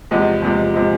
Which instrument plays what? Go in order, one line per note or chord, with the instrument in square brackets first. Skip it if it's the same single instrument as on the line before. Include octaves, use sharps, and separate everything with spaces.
[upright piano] E2 C3 F3 G#3
E2 C3 F3 G#3
C3 F3 G#3